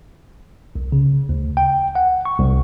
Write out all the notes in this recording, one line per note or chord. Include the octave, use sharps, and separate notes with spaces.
C2
C#3
D2
G5
F#5
C#6
C2